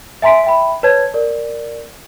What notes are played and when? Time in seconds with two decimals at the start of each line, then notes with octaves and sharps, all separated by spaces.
0.22 E5 G#5 A#5 C6 B6 D7
0.44 E5 G5 B5
0.83 B4 C#5 A5 G#6
1.14 A#4 D5